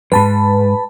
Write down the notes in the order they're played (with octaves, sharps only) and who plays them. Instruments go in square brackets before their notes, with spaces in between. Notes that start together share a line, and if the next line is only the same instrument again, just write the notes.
[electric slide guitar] F2 G#2 [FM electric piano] B4 A5 B5